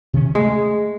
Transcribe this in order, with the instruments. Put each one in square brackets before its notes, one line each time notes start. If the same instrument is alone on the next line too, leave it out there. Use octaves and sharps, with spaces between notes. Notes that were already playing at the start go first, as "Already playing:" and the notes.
[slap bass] C3 D#3 C#4
[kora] G#3 [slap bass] A3